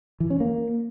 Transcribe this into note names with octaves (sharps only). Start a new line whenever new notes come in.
E3
C#4
A#3